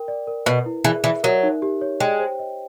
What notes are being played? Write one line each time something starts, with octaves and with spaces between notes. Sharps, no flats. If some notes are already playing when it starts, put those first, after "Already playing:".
Already playing: A#4 G5
D5
A#4
B2 B4
E4
E3 G#4
E3 E5
F#3 A#4
D#4
G4
C#5
G#3 G5
C5
D#5